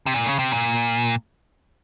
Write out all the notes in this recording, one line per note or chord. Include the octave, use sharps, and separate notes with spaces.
C3
A#2
C#3
C3
A#2